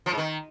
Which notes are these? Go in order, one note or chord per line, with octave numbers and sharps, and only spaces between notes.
F3
G#2
D#3